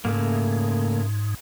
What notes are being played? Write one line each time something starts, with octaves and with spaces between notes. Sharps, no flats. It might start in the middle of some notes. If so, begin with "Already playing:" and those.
G#2 C#3 A3 A#3